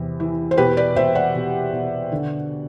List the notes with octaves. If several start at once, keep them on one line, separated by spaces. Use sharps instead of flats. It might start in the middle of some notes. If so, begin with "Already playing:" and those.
Already playing: E2 C3
E3
C5
B2 G4 B4
B4 D5
B2 C5 E5
D5 F#5
B2
B2
D3